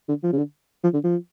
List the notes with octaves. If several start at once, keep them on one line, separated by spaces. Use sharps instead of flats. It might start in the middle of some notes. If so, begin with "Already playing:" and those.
D3
F3
C#3
D3
F3
D3
F3